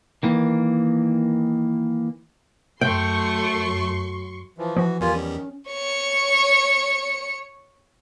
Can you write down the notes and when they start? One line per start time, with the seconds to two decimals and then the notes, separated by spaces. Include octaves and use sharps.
0.23 D#3 E3 A#3
2.81 F#2 F#3 A3 G5 C6 C#6
4.58 E3 F3
4.77 E3 F3 F#4
5.01 E2 G3 F4 A#4 G#5
5.15 D#3 C#4
5.69 C#5 C#7